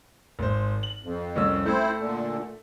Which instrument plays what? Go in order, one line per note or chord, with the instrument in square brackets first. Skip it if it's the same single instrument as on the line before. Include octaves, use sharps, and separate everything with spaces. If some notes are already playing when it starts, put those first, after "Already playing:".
[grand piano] G#1 C5
F#7
[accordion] F2
[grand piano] C2 C#4 E6
[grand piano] A3 [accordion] C4 E4 C5
[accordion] A#2 D3